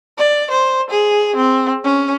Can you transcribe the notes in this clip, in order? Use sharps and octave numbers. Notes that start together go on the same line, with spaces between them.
D5
C5
G#4
C4
C#4